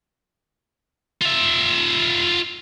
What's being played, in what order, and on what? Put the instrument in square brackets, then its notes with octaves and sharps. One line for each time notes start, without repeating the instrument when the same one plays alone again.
[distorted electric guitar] F4 E5